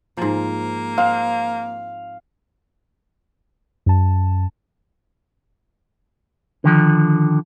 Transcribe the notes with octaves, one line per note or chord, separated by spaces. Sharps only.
G#2 F3 A#3
C4 F5
F#2 A5
D3 D#3 F3